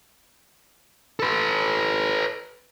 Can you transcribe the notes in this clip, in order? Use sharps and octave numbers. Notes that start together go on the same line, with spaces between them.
A4 B4